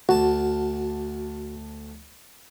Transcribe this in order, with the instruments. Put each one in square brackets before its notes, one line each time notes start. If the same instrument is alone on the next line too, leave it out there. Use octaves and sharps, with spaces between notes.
[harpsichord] D2 A5 [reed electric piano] F#4